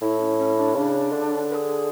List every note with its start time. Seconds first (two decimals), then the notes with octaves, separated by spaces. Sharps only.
0.02 A2 E4
0.20 C#4
0.38 C#4
0.56 D4
0.75 C#3 D4
1.12 D3
1.50 B4
1.54 G#4